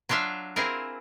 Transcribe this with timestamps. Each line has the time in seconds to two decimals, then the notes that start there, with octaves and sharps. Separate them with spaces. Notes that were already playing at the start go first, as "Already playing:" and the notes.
0.09 F#3 D4 F4 E5 F5
0.56 C4 E4 F4 G#4 A#4